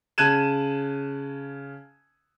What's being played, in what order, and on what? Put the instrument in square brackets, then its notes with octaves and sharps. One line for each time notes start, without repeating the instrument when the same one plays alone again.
[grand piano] C#3 A5 F#6 G#6 D#7 E7